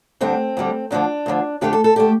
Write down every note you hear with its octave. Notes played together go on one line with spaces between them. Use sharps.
D2 D3 G3 C4
D2 D3 G3
D2 D3 F3 D4
D2 D3 F3
F2 D3 A3 G4
A4
A4
D3 A3 G4